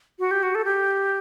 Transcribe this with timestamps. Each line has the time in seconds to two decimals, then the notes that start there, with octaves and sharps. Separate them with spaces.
0.19 F#4
0.31 G4
0.43 F#4
0.55 A4
0.65 G4